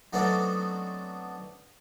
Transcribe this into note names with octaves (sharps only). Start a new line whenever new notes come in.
F#3 A3 B3 C4 D4 D#4